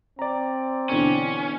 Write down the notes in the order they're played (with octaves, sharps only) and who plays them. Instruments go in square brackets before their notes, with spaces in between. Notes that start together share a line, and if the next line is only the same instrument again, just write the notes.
[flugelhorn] C4 [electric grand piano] D5 A#5
[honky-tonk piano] B2 D3 E3 [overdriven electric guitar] C#4